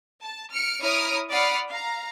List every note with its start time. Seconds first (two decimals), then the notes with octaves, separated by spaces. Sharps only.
0.21 A5
0.52 F6 C#7 D7
0.81 E4 C#5 A#5 D#6 F6 D7
1.30 D5 F#5 B5 D#6 F6 C7
1.69 F5 A#5